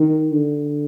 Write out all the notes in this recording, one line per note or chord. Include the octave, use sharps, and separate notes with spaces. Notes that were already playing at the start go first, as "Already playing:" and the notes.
Already playing: D#3
D3